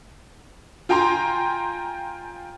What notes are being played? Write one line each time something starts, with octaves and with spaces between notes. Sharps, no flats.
F4 G5 G#5 A#5 C6